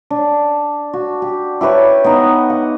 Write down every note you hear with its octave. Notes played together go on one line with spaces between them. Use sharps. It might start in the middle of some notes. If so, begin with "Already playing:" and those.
D4
F#4
G4
E4 G4 B4 C#5
B3 D#4
F#5